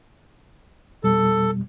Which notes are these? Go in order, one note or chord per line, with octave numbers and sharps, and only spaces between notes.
F2 B2 G3 A4